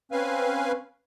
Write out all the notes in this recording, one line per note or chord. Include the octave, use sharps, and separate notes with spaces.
C4 C#4 B4 F5 G#5